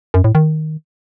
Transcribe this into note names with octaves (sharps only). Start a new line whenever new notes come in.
F#2
A2
D#3